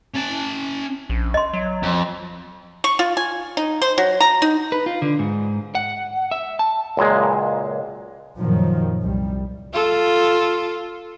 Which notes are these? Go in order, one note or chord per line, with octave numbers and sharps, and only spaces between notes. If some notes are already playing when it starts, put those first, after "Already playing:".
C#4 A5
A#1
D#5 C6
F#3
F2
C#6
F4
G#5
D#4
C5
F#3
A#5
D#4
B4
F4
D3
G#2
F#5
E5
A5
C#2 F#2 A#2 G#3
F#2 A#2 D#3 F3 F#3
C2 G3
F4 A4